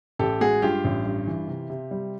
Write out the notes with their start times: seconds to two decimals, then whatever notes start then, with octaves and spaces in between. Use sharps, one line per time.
0.19 A1 G4 A4
0.41 G#3 F#4 G#4
0.62 G2 F4 G4
0.84 A1
1.05 G2
1.27 E3
1.48 C3
1.70 C3
1.91 G3